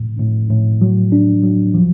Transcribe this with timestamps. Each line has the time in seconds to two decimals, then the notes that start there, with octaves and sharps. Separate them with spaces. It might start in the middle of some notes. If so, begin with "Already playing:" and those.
Already playing: A2
0.19 A2
0.50 A2
0.81 F#3
1.12 D4
1.43 F#3
1.74 F3